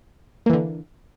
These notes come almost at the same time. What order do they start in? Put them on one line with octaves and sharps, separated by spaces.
A#3 E3 D3